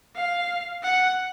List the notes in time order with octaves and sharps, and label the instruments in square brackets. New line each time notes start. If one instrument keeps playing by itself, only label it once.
[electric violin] F5
F#5